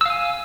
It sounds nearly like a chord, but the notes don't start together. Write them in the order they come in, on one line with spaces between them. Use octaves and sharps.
E6 F5 G#5